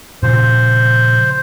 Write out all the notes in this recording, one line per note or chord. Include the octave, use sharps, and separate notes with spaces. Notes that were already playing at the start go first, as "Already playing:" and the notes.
A#2 C#3 F3 C5